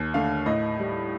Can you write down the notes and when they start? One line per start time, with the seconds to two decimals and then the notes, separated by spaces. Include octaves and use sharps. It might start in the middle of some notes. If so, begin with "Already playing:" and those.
Already playing: D#2
0.14 D3 A3 F5
0.46 A2 D#5
0.79 G3